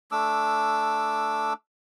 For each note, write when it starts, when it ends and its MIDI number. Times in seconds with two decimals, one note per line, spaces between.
0.12 1.53 57
0.12 1.53 62
0.12 1.53 86
0.12 1.53 88